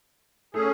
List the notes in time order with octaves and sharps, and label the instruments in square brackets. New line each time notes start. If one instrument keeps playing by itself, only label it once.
[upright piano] A3 [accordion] C#4 G#4